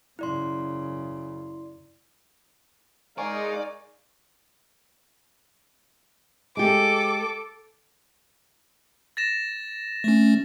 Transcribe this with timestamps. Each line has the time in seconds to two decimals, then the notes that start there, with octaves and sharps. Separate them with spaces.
0.19 F#2 C#3 E4 D5 C6
3.18 G#3 D#4 A#4 D5 F5 G#5 C#6
6.57 G#3 G4 A4 D6
9.17 A6 A#6 E7
10.04 A3 C#4